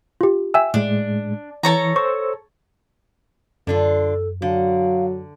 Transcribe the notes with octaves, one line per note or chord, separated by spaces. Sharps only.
F4 G4
E5 G5 G#5 E6
A2 G#3 D4
E3 A4 C#5 A#5
C5 C#6 E6
F#2 D3 D4 F4 A4
D3 F#3 F5